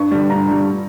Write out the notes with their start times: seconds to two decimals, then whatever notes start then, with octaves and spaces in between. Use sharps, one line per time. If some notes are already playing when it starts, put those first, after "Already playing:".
Already playing: G2 C#6
0.11 D3 G3
0.29 G2 A#5
0.47 D3 G3